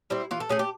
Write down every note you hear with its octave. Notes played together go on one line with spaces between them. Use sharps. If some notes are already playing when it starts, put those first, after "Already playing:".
G3 C4 E4
E3 F4
A4
A3 C#4 G#4
G4